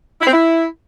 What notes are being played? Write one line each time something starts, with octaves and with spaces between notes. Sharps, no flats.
E4
C4
E4